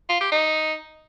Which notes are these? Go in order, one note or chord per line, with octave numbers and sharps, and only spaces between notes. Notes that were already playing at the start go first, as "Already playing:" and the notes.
F4
G4
D#4